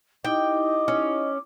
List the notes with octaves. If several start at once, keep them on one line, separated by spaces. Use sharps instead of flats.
D#4 E4 G4 D#5 G5 D6
C#4